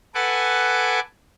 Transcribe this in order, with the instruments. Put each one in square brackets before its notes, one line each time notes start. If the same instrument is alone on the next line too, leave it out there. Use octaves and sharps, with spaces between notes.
[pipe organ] A4 B4 F#5 G#5 D6